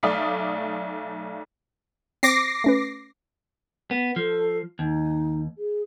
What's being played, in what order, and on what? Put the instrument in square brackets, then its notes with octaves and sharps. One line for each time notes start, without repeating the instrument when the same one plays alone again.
[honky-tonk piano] B1 A3 D5 F5 D#6 B6
[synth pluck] C4 C5 [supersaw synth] D6 A#6 C7
[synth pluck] A3 C#4 B4
[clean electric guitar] B3
[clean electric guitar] F3 [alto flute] A4
[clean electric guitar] D#2 [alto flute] D#4
[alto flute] G#4